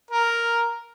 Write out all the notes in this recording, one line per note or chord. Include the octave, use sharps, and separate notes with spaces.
A#4